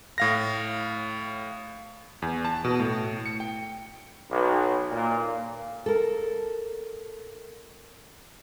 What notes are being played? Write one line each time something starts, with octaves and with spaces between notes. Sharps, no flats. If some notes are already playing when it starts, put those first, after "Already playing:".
A2 F5 A#6
E2
A5
B2
A2
C#7
G5
B1
A#2
A4 A#4